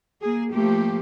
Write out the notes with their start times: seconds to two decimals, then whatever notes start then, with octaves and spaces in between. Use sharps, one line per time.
0.22 A#3 G#4
0.52 F3 A3 A#3 G4